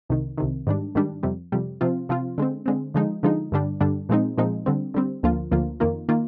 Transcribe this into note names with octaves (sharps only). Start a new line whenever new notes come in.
C2 C3 D#3
C2 C3 D#3
G#2 D#3 G3 D4
G#2 D#3 G3 D4
F2 C3 G3
F2 C3 G3
C3 F3 C4 F4
C3 F3 C4 F4
D3 G#3 C4
D3 G#3 C4
D3 F3 G#3 D#4
D3 F3 G#3 D#4
G2 D3 G3 D4
G2 D3 G3 D4
A#2 F3 G#3 C4 D#4
A#2 F3 G#3 C4 D#4
D3 G3 C4
D3 G3 C4
D2 D3 F3 A#3 F4
D2 D3 F3 A#3 F4
F2 D#3 A#3 F4
D#3 A#3 F4